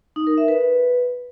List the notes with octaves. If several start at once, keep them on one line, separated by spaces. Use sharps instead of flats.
D#4
A#4
E5
B4